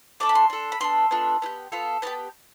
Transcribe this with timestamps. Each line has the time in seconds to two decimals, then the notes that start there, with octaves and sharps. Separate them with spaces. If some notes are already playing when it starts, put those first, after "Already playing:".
0.20 A3 D4 A4 D6
0.29 B5
0.35 C6
0.50 D4 A4
0.72 B5
0.80 B3 D4 A4 C6
1.11 B3 D4 F4 A4
1.42 B3 E4 G4
1.72 B3 F4 A4
2.02 B3 D4 G4 A5